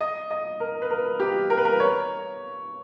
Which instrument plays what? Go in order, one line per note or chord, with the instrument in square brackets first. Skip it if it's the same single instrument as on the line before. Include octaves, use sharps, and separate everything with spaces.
[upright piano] D#5
D#5
A#4
B4
A#4
G4
A#4
B4
A#4
C#5